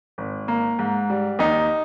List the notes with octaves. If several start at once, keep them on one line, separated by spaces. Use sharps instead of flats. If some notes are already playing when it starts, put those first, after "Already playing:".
G#1
A#3
G#2
G3
D#2 D#4